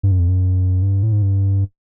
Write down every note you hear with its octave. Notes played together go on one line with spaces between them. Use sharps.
G2
F#2
F2
F#2
G2
A2
G#2
G2